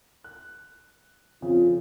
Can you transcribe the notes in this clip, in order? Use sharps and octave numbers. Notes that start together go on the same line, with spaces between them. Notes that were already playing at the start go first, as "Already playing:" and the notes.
F#6
F2 C#3 F4